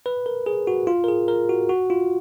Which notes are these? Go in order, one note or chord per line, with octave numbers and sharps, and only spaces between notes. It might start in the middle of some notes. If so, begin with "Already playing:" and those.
B4
A#4
G#4
F#4
F4
A#4
G#4
A#4
F#4
F#4
F4